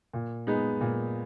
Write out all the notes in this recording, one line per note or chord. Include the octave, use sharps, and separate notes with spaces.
A#2
G#3 B3 D#4
A#2